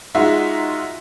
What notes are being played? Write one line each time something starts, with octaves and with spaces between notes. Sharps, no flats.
G#3 D#4 F4 F#4 E5